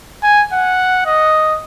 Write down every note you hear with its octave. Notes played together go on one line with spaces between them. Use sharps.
G#5
F#5
D#5